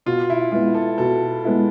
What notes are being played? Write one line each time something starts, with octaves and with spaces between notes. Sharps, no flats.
B2 F4
E4
G#3 B3 E4 F4
A4
B2 A4
G#3 B3 E4